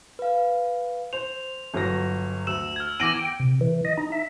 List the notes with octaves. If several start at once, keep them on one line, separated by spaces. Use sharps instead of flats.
B4 F5
C5 F7
G1 F#3 A#6
D2 E6 E7
F6 G#6
E2 D6 A#6 D7 D#7 F#7
G5
C3
E3
D#5
D#4
E5